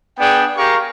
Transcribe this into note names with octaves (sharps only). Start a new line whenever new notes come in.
B3 D4 G#4 G5
G4 G#4 A#4 F5 C#6